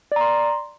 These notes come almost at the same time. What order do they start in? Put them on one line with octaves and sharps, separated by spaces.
D5 A#5 C6